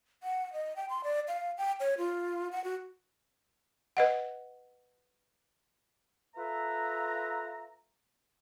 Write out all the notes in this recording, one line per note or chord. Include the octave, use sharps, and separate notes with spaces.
F#5
D#5
G5
C6
D5
F5
G5
C#5
F4
F#5
F#4
B4 D#5 F#5
F4 A4 B4 E5 A#5